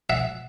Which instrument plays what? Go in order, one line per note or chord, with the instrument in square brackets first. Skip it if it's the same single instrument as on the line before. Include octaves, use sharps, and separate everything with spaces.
[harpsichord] E5 F#5